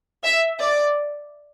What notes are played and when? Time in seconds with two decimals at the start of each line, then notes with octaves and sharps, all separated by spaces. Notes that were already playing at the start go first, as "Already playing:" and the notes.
0.25 E5
0.59 D5